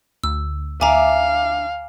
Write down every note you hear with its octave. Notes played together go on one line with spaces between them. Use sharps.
D2 E6
D2 D4 E5 F5 G#5 A#5 D6